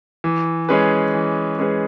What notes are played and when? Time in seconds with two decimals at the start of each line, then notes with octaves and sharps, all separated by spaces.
0.24 E3
0.69 G#3 C#4 G#4 B4
1.14 E3
1.59 G#3 C#4 G#4 B4